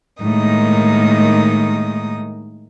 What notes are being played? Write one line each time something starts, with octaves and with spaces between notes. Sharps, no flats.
A2 D#3 G#3 A#3 D#4 D#6